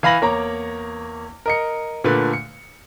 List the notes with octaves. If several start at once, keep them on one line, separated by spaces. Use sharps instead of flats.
E3 F5 B5 A#6 F#7
E2 A#3 C#5 A#5 D6
A#4 D#5 C#7
A#2 D3 A3 B4
C#7